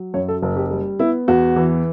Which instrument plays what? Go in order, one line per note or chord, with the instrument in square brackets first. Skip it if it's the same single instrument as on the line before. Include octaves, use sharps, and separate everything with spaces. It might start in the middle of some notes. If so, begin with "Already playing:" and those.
Already playing: [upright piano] F#3
F#2 C#5
A4
F#1
G4
G3
B3 E4
E2 F#4
E3